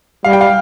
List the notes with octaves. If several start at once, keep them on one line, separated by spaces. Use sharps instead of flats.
G3 F5
G5
F5